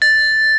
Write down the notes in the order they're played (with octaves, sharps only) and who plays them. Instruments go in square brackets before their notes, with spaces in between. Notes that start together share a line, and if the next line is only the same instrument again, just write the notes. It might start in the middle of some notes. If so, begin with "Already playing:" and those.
[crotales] A6